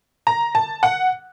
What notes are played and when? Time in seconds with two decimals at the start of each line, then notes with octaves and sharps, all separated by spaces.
0.27 A#5
0.55 A5
0.83 F#5